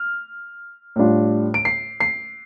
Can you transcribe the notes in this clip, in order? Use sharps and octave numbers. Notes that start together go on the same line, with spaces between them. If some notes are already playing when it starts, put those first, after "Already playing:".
Already playing: F6
A2 G3 D4 F4
D7
C7
C7